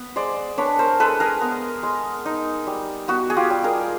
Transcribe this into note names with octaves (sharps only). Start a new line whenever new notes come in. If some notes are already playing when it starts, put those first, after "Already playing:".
Already playing: B3
G#3 C5 D5
D4 B4 C#5
A#4 C5
G#3 A4 B4
G#4 A#4
B3
G#3
D#4
G3
B3 F#4
G#4
F4 G4
G3
G#4 A#4